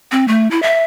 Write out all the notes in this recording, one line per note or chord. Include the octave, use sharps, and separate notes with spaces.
C4
A3
E4
E5